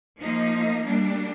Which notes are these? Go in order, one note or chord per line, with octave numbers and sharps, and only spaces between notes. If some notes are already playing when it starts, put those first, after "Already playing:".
F3 A#3 D#4
G3 A#3 D4